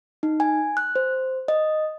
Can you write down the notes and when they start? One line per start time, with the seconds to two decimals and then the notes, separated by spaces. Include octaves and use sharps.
0.23 D#4
0.40 G#5
0.77 F#6
0.96 C5
1.48 D#5